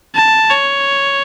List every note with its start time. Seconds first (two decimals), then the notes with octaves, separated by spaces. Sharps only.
0.16 A5
0.50 C#5